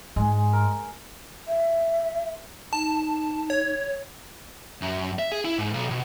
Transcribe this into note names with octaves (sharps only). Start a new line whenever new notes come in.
G#2 G#3
A#4
E5
D#4 A5
C#5
F#2
E5
G#4
E4
G#2
B1
B2